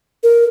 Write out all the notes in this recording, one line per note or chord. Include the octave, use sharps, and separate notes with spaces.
A#4